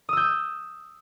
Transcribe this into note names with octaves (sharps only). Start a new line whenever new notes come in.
D#6 E6 G6